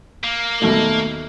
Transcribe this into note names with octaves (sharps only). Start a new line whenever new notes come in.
A#3
D#2 B2 A3